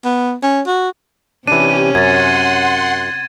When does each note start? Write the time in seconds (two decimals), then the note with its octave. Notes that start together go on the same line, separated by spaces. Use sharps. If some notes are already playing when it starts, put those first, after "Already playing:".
0.05 B3
0.43 C#4
0.67 F#4
1.47 C3 E3 C#4 D4 G4 D#7
1.95 F#2 F#5 C6 G#6 A6